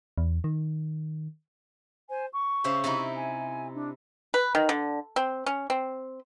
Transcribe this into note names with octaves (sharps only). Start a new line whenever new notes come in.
E2
D#3
C5 G#5
C#6
C#3 C5 E5
C3 D#4 E4
G#5
D4
B4
D#3
D3
C4
C#4
C4